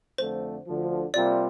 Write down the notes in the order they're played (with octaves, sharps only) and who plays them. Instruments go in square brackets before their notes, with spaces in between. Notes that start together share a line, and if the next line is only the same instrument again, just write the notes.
[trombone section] F2 D3 F3 A3 [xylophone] C5
[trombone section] D2 D3 F3
[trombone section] C3 G3 A#3 F4 [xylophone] D5